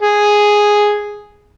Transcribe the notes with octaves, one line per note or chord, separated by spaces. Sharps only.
G#4